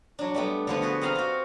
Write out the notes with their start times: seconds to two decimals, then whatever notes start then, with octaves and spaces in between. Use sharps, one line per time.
0.19 F#3 D4
0.34 G3 A3 B3
0.67 D3 F3 B3
0.82 F#4 G#4 A4 B4
1.01 C4 G4 D#5 F5 A#5
1.15 F4 F#4